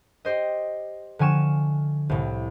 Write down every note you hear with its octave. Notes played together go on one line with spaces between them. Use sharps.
G4 C5 D#5
D3 F3 G#5 C#6 E7
C2 A2